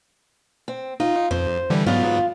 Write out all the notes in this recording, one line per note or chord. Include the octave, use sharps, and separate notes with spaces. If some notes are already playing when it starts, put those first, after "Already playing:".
C4
D#4 F4
F2 C5
D3 E3 G3
G#2 F#3 B3 F4